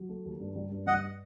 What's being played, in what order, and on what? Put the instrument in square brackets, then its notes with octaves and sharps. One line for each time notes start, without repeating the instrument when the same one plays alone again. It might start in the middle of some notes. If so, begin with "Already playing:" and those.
Already playing: [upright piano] F#3
A3
D#2
G2
G3
G2
[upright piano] G3 [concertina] D#5 F#5